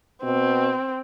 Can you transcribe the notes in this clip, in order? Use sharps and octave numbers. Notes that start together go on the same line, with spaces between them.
B2 C4